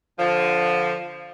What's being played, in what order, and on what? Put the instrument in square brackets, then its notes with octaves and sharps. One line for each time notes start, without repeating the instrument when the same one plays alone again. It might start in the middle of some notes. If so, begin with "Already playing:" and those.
[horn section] D3 F3